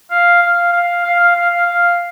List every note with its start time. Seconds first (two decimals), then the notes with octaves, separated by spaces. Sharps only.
0.11 F5
0.42 F5
0.73 F5
1.04 F5
1.20 F5
1.35 F5
1.50 F5
1.66 F5